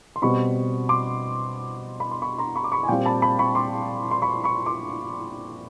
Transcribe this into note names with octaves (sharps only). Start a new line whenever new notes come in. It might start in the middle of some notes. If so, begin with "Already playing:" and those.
C6
B2 G3 C4 B5 C#6
C6 D6
B5
C6
B5 C#6
A#5 C6
B5 C#6
D6
B5 C#6
G#5
A#2 G3 C4 F5 G5
A5 B5
A5 B5
B5 C#6
C6 D6
C6
B5 C#6
B5 C#6
C6 D6